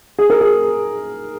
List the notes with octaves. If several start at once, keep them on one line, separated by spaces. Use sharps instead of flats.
G#4
A#4
G#4